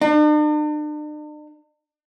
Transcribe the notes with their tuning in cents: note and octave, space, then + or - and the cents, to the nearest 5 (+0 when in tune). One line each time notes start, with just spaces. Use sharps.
D4 +45